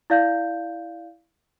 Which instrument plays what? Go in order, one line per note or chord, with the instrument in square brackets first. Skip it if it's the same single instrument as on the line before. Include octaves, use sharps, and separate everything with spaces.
[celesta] E4 D5 F5 G6